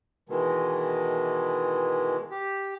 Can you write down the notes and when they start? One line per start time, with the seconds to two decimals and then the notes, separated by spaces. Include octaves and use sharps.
0.29 B2 D#3 E3 G#3
2.31 G4